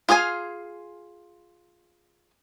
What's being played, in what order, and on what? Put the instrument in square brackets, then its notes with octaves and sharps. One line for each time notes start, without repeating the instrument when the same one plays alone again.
[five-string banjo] F4 G#4 F5 G#5